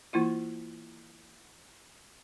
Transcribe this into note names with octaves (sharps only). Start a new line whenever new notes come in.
E3 A#3 E4 F4